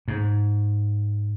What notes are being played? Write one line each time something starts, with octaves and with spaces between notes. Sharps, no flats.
G#2